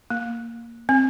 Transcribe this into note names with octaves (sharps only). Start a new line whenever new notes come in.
A#3
C4